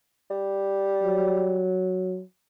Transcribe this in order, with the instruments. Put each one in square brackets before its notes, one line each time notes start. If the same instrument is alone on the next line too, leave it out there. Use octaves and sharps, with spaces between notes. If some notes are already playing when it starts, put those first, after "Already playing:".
[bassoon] G3
[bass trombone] F#3